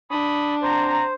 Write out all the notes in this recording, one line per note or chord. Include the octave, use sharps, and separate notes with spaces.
D4 B5 D#6
C4 C5 F#5 A#5